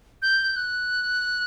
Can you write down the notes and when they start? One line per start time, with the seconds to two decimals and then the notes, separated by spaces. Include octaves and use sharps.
0.22 G6
0.56 F#6